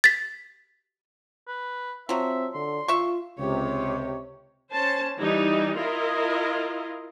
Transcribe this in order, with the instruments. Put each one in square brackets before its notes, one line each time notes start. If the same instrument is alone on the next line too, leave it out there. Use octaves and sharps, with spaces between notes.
[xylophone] A6 B6
[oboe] B4
[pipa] F3 F#3 [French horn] C4 [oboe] E5
[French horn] D3 [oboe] C6
[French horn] F4 [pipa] E5 C#6
[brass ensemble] C#2 C3 [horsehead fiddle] G4 C#5
[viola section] C#4 C5 A5
E3 G3 D#4
E4 F4 A#4 D#5